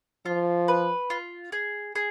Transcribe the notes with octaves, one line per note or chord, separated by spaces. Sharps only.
F3 F4
B4
F4
G#4
G#4